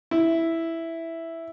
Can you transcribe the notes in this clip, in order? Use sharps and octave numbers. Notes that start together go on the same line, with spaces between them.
E4